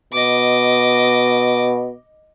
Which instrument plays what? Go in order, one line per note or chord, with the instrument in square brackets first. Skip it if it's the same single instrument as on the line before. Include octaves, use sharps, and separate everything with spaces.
[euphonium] B2 [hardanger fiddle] D#5 D6